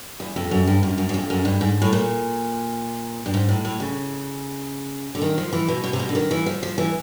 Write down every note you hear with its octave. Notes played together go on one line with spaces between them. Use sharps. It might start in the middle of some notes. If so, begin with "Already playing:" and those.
E2
F2
F#2
G2
F#2
F#2
F#2
F2
F#2
G2
G#2
A2
A#2
G2
G#2
A2
A2
C#3
D3
D#3
F3
E3
B2
B2
C3
B2
D3
D#3
E3
F3
F3
E3